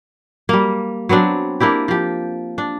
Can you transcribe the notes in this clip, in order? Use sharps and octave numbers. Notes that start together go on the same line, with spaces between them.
G3 A#3
F#3 B3 C4 D4
A#3 D4 E4 G4
F3 G4
D4